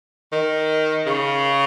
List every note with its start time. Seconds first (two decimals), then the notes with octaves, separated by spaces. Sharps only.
0.32 D#3
1.06 C#3